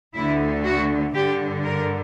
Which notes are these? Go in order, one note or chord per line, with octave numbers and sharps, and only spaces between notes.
D2 D3 E4
F#4
G2 D3 G4
A#4